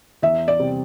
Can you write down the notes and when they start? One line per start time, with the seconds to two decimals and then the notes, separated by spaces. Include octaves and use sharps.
0.22 E2 E5
0.48 D5
0.59 C3 G3 C4 G4